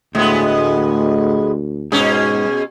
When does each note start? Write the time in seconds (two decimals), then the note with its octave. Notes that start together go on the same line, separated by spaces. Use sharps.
0.15 D2 A2 G#3 B3
1.92 G#2 B2 C#4 G#4